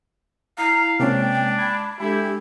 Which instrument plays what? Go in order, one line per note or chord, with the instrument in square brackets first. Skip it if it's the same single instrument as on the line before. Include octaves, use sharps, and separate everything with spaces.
[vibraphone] E4 [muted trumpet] F5 [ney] A#5
[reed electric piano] C3 A#3 C#4 [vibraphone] G#3 [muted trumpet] D4 [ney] G5
[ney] B5 [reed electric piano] G#6
[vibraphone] G#3 D4 A4 [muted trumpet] E4 [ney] G4